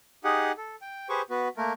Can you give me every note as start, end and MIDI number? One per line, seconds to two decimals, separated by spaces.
0.24 0.52 63
0.24 0.52 67
0.24 0.52 68
0.24 0.52 78
0.57 0.76 69
0.82 1.08 79
1.09 1.22 67
1.09 1.22 68
1.09 1.22 71
1.09 1.22 72
1.09 1.22 85
1.30 1.48 59
1.30 1.48 66
1.30 1.48 71
1.57 1.73 57
1.57 1.73 58
1.57 1.73 70